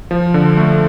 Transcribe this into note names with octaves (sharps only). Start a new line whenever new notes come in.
F3
D3
A3